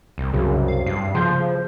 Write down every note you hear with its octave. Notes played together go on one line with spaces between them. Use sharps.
C2
C2 F#2 C#3
F5
G2 C7
C#3 F3 C6 G6